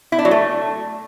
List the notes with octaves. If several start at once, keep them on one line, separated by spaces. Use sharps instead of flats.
E4
D4
F#3
A3